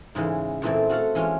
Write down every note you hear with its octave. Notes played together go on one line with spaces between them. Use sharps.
G#2 C#3 E3 G#3
E2 A#2 E3 A3 C4
F#4 A4 F5 F#5
E3 G#3 C#4 F4